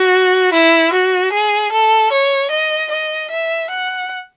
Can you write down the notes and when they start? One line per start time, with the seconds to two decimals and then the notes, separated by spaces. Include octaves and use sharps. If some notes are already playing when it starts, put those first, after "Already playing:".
Already playing: F#4
0.53 E4
0.93 F#4
1.33 G#4
1.72 A4
2.12 C#5
2.51 D#5
2.91 D#5
3.31 E5
3.70 F#5